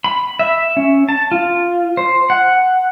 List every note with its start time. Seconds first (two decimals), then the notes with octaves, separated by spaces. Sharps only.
0.04 B5
0.39 E5
0.77 C#4
1.09 A5
1.32 F4
1.97 C5
2.30 F#5